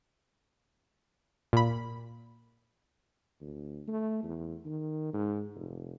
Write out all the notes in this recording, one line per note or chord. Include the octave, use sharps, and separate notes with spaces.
A#2 B5
D2
A3
E2
D#3
G#2
F1